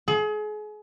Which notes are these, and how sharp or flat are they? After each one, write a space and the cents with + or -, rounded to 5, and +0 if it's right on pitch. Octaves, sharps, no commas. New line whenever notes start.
G#4 +35